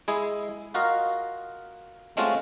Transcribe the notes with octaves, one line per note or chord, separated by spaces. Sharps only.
G#3 E4 G#4
F4 F#4 A#4 D#5 F5
G#3 A3 C4 C#4 F4 F#4